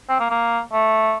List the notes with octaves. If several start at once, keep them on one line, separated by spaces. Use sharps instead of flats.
C4
A#3
A#3
A3